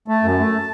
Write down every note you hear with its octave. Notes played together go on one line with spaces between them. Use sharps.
A3 A5
F#2
A3